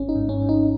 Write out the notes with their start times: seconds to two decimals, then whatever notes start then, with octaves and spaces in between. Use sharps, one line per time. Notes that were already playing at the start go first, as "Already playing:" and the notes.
Already playing: G#1 C#4
0.09 D#4
0.16 G#2
0.29 C#4
0.42 G#2
0.49 D#4